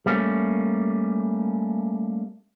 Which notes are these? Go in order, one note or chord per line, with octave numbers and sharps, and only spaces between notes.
G3 A3 A#3 C#4